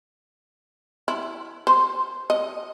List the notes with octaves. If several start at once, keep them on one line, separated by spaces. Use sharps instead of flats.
E4
C5
D#5